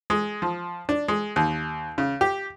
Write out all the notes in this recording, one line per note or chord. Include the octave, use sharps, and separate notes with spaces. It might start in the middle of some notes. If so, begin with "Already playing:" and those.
G#3
F3
D4
G#3
D#2
C#3
G4